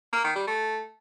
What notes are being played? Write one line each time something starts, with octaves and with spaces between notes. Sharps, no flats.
A#3
D#3
G3
A3